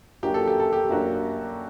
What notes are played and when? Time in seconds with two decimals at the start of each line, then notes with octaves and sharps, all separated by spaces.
0.23 F#2 F#3 A#3 D4 F#4 G4
0.34 A4
0.47 G4
0.60 A4
0.73 G4
0.89 F#2 F#3 A#3 D4 F#4